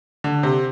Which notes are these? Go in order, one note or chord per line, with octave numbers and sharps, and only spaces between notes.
D3
C3